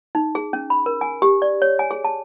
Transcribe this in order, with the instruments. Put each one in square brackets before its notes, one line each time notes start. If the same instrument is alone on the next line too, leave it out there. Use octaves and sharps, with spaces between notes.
[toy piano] D#4
G#4
C#4
B5
A#4
G#5
G4
D5
C#5
G#5
G#4
A5